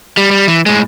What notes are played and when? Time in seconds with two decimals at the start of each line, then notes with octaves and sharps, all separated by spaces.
0.17 G3
0.31 G3
0.48 E3
0.66 A2 G#3